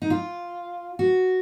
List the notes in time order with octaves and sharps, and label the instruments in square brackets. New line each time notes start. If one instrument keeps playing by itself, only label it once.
[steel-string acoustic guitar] D#4
F4
F#4